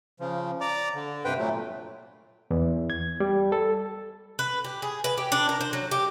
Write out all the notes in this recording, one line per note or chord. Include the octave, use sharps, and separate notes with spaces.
C#3 F3
D5 A#5 D6
D3
G2 C3 B4 C5 G5
A#2 F#3 A3
E2
G#6
G3
A4
B4
G4
G#4
B4
G4
D4
A#4
C5
F#3
G4